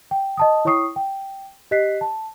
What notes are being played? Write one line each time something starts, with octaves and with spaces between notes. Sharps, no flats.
G5
D#5 A5 D#6
E4 C#5 G5 C#6 D#6 C7
G5
G4 D#5 F#6 B6 C7
A5